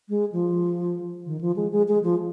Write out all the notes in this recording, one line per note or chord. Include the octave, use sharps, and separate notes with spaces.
G#3
F3
D#3
F3
G#3
G#3
G#3
F3